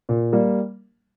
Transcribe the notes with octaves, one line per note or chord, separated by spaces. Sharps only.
A#2
G3 A#3